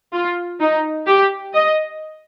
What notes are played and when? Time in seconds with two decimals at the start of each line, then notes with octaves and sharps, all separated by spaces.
0.13 F4
0.60 D#4
1.06 G4
1.53 D#5